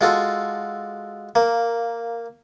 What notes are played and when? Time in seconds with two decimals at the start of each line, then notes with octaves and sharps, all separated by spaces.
0.01 G#3 F4 F#4 A4
1.35 A#3